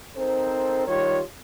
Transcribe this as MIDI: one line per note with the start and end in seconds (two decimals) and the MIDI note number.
0.17 0.87 60
0.17 0.87 63
0.17 0.87 69
0.17 0.87 70
0.17 0.87 72
0.88 1.21 51
0.88 1.21 55
0.88 1.21 65
0.88 1.21 67
0.88 1.21 73